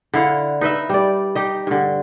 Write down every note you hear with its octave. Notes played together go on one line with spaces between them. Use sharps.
D3 E4 F5 F#5
D#4 B4 D#5 E5
G3 D5
D#4 G4 D#5
G2 D3